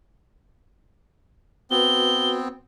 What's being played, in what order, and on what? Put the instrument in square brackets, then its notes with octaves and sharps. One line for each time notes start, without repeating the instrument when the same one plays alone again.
[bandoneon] B3 C4 [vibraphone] F#4 B4 [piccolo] G7